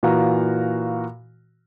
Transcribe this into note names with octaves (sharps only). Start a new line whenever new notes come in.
A#2 E3 F#4 F5 A#5